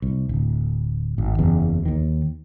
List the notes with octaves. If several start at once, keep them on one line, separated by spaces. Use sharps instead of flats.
C2
D1
G#1
F#1 E2
D#2 D#3